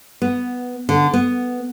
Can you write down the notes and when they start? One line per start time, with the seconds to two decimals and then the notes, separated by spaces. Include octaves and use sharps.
0.22 B3
0.89 D3
1.14 B3